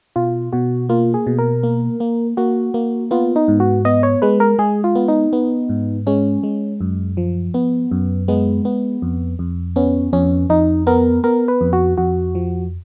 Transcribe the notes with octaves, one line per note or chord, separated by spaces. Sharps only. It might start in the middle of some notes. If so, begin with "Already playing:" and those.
B2 F4
B2 F#4
A#3 F4
G#4
B2
A#4
A#3
A#3
A#3 F#4
A#3
B3 F4
D#4
G#2
F#4
B3 D#5
C#5
G#3 B4
A#4
G#3 G#4
F4
B3
D#4
B3
G#2
G#3 C#4
G#3
F#2
F3
B3
F#2
G#3 B3
B3
F2
F2
B3 C#4
F2 C#4
F2 D#4
B3 A#4
B3 A#4
B4
F2
F#4
F2 F#4
F3